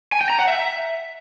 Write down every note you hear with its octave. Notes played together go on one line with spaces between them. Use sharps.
G#5
G5
A#5
F#5
E5